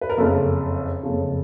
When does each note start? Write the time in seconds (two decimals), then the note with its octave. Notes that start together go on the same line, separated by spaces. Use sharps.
0.01 B4
0.10 A#4
0.18 F#1 F2 C#3 A4
1.03 F#1 F2 C#3